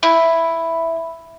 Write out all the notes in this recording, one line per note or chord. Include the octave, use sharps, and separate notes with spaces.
E4